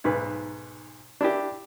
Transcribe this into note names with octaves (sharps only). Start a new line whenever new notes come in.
B1 G#2 B4
D4 E4 G4